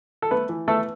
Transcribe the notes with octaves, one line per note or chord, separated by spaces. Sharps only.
A4
A3 B3 B4
E3
A3 B3 A4